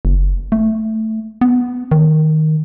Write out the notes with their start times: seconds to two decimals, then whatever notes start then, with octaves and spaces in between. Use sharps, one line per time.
0.05 F#1
0.52 A3
1.41 B3
1.91 D#3